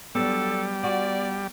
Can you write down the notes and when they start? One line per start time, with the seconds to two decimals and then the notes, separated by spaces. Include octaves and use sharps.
0.15 F#3 G3 B3 D4 A4
0.84 F#4 D5